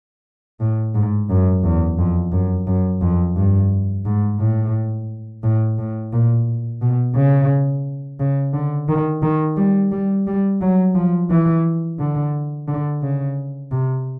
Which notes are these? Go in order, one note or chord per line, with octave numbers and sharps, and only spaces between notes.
A2
G#2
F#2
E2
F2
F#2
F#2
F2
G2
G#2
A2
A2
A2
A#2
B2
C#3
C#3
D3
D#3
D#3
G3
G3
G3
F#3
F3
E3
D3
D3
C#3
C3